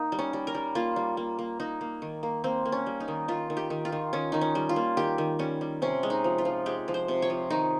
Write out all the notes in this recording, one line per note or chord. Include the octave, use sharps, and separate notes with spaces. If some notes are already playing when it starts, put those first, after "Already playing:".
Already playing: A#3 D#4
G3
C#4
G3
A#4
G3
A#3 F4
G3
A#3
A#3
A#3 D#4
A#3
D#3
A#3
A#3 C4
A#3
C#4
G3
D#4
D#3
D#3 F4
D#3
G4
D#3
F4
D#3
D#3 C#4
D#3 D#4
C#4
G3
F4
A#3
D#3 G4
D#3
G3 C#4
G3
C3 C#4
G#3
D#4
F3
F4
F3
G#3 G4
F3
C5
C3
C#5
F3
D#3 D#4